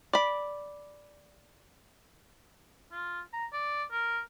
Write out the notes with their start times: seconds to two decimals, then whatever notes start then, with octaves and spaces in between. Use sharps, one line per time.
0.13 D5 B5
2.92 F4
3.33 A#5
3.53 D5
3.91 A#4